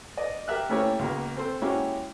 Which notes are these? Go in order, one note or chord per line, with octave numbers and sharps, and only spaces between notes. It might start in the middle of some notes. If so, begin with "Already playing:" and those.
D5 D#5
G4 A#4 E5 F#6
A3 A#3 C#4 E4 G4 C#5
C#2 B2 A#3
C4 A4 C5
G#3 A#3 C#4 E4 F#4 G4